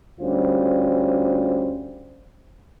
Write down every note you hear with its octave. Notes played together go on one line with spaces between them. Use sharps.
D2 G3 C#4 D4 F4 C5